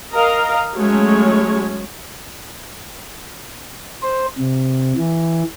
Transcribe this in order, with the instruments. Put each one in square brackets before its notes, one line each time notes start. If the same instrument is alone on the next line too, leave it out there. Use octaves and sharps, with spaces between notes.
[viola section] A#4 D#5 F5 A#5
F#3 G#3 A3 C#4 C#5
[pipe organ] C5
C3
E3